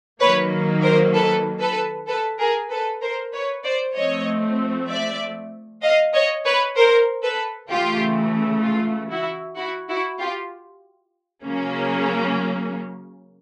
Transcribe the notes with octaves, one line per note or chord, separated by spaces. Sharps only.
D#3 F#3 A#3 B4 C#5
A#4 C5
A4 B4
A4 B4
A4 B4
G#4 A#4
A4 B4
A#4 C5
B4 C#5
C5 D5
F3 A3 C4 C#5 D#5
D5 E5
D#5 F5
C#5 D#5
B4 C#5
A#4 C5
A4 B4
C#3 E3 A3 F4 G4
F4
E4 F#4
E4 F#4
E4 F#4
F4 G4
C#3 F#3 A#3 C#4